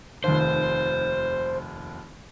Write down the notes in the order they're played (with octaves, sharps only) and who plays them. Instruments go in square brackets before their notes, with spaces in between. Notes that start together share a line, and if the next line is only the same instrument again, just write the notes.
[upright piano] F1 D#2 [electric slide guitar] C5